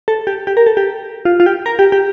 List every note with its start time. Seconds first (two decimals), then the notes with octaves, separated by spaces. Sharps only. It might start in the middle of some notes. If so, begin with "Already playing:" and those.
0.08 A4
0.27 G4
0.47 G4
0.57 A#4
0.67 A4
0.77 G4
1.25 F4
1.40 F4
1.46 G4
1.66 A#4
1.79 G4
1.92 G4